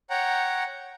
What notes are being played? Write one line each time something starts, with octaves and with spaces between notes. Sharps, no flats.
C#5 F#5 G5 A#5